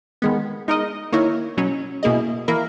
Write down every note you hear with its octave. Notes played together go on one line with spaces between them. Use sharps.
D#3 G#3 B3
G#3 D#4 A#4 D#5
D#3 A#3 E4 A#4 C#5
B2 F#3 C#4
B2 A#3 E4 G#4 D#5
E3 A#3 E4 A#4